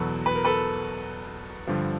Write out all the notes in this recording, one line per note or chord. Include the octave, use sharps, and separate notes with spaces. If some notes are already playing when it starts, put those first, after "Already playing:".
Already playing: E2 B2 F#3 A4 B4
B4
A#4
A4 B4
G2 D3 F3